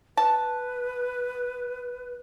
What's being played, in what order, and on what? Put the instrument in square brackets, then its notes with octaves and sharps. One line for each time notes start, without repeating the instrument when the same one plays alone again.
[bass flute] B4 [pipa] A5